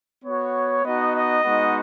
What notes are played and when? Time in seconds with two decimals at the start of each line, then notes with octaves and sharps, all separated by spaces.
0.24 B3 F#4 C#5
0.84 B3 D#4 F#4 D#5
1.15 D#5
1.44 G#3 B3 D#4 F#4